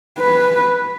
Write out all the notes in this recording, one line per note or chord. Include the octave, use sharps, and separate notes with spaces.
B4